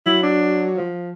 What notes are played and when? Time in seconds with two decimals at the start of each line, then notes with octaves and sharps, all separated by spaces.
0.06 F#3 E4
0.23 D4
0.77 F3